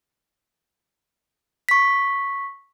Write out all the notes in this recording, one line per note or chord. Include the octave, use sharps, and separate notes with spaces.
C#6 B6